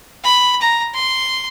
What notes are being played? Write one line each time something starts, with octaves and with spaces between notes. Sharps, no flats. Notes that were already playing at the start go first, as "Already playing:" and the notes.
B5
A#5
C6